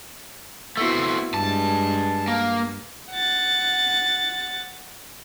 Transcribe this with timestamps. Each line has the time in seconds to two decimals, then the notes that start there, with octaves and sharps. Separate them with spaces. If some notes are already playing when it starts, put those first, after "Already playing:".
0.77 A3 B3 C4 E4 F#4
1.34 G2 G#3 A5
2.28 A#3
3.11 F#5 A6